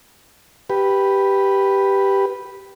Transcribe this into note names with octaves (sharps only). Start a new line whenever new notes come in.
G4 B4